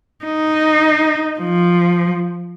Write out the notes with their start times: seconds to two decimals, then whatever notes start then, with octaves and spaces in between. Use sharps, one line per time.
0.25 D#4
1.40 F3